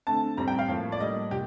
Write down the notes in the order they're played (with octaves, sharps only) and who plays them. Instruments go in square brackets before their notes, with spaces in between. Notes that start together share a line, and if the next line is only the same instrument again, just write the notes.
[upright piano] D3 A3 C4 A5
A2 G3 C4 A#5
G5
F5
A2 F3 A#3
D5
A2 G3 A#3 D#5
A#2 G4